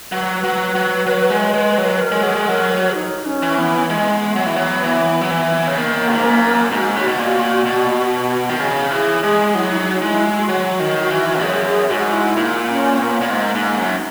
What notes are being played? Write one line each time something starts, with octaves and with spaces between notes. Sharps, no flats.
F#3 B4
F#3
F#3
F#3
G#3
G#3
F#3
A#4
G#3
F#3 G#4
G#3
F#3 A#4
C#5
D#4
C#4
E3
B3
G#3 B3
F#3
E3
F#3
E3
F#3
E3
C#3
D#3 A#3
G#2
F#2
G#2 F#4
C#3
B2
A#2
B2
D#3
C#3 G#4
E3 G#4
G#3 G#4
F#3 E4
E4
D#4
G#3 E4
F#4
F#3 F#4
D#3
E3
F#2 G#4
G#4
G#2 F#4
E4
A#2
C#4
B3
A#2
G#2 A#3
G#2
F#2
D#4